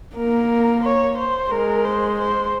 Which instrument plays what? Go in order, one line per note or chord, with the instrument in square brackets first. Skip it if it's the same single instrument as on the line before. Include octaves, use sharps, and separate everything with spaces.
[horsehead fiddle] A#3 [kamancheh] A#4
[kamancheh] C#5
C5
[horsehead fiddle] G#3 [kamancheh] A#4
[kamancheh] C5
C5